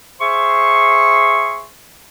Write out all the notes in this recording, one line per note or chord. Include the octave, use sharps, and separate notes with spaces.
G#4 C5 E5 C6 C#6